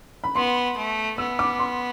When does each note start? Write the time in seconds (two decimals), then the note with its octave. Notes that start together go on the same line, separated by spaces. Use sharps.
0.24 B5
0.35 B3 C6
0.77 A3
1.18 B3 E6
1.39 D6
1.59 C6